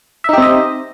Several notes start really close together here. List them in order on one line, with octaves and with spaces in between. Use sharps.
E5 D#4 G4 C4 D#5